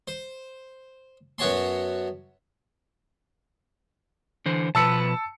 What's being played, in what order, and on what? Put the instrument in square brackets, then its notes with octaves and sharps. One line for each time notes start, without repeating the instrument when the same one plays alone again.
[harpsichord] C5
F#2 B3 F#4 C#5 A5 C6
[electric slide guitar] D3 E3 C5
[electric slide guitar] B2 F3 B4 [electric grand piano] A5 E6 C#7